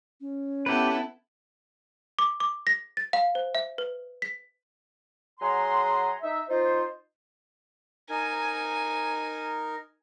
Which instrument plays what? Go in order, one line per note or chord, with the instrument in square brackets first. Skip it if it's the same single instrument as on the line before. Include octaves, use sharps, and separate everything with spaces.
[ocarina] C#4
[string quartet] B3 E4 A4 [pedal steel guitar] G4 B4
[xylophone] D6
D6
A#6
A6
F5
C5
E5
B4
B6
[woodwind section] F#3 G#4 F#5 G#5 A#5 C6
D#4 E5
D#4 F4 C5
[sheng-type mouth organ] D#4 A#4 [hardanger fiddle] G#5